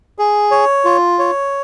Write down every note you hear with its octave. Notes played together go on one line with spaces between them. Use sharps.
G#4
C#5
F4
C#5